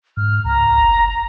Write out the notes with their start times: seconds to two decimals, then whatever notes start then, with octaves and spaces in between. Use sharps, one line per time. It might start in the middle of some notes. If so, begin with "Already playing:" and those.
0.17 G#2 F6
0.45 C#2 A#5
0.78 F#1